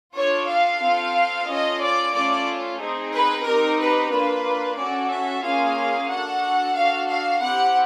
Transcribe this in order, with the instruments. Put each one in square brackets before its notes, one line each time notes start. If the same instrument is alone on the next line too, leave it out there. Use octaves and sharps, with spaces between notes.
[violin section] D4 F4 A4 C#5
F5
C4 F4 A4
C#4 F4 A4 D#5
D5
A3 C#4 F4 A4 D5
C4 D#4 G#4
B4
C4 D#4 G4 A#4
B4
A#3 D4 F4 B4
C#4 F#4 A4 D5
E5
A#3 C#4 F4 G#4 F5
D4 F#4 A4 F#5
D4 F#4 A4 F5
F5
C4 E4 G4 F#5